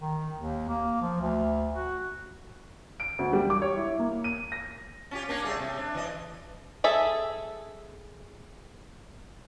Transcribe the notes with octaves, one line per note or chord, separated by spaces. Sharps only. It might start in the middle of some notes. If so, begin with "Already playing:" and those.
D#3
D#2
A#3
F3
D2
F#4
D7
D2
G3
D6
C#5
E4
A#3
D#7
A#6
C#4 F4 G4
A#3 C#4 D4
G3 A3 G#4
A2 C3
D4
E3 D#5
G#4 A4 E5